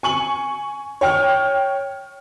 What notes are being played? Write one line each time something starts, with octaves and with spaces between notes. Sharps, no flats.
G#5 C#6 F#7
C#5 G5 F6